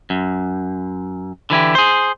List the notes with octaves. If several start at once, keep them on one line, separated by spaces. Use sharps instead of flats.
F#2
D3 E3 E4 G4
G#4 C5